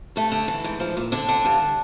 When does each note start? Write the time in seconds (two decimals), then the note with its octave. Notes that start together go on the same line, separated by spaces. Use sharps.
0.16 G2 A3
0.32 D3
0.48 E3
0.64 G#2
0.80 F3
0.97 A#2
1.12 D3 D4
1.28 D3
1.45 G2